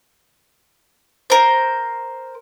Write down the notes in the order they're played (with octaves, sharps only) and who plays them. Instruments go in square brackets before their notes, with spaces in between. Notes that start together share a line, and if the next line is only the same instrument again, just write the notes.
[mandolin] A#4 C5